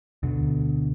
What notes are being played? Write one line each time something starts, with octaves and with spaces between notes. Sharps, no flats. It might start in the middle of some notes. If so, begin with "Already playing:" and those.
D2 B2 D3